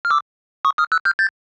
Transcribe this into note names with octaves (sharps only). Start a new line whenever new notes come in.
F6
D6 E6
C#6 D#6
D#6 F6
E6 F#6
F6 G6
G6 A6